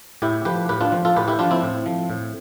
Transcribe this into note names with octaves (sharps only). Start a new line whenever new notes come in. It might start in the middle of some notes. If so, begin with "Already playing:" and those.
A2 E4 G4
F3 G4 B4
A2 G4 B4
D4 F4
F3
F4 A4
A2 G4 B4
E4 G4
F3 D4 F4
C4 E4
A2
F3
A2